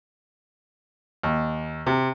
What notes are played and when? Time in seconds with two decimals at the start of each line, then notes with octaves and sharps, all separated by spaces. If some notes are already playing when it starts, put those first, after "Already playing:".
1.23 D#2
1.86 C3